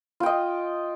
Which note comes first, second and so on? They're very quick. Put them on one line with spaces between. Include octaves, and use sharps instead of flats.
F4 G5 D#5